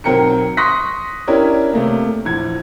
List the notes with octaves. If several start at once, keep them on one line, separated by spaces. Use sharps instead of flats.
B1 F#3 C4 A#4 G5 C#7
C6 C#6 D#6 F#6 A#6 B6
C#4 D4 E4 G4 A#4
C3 A3 A#3
A#1 E2 G#6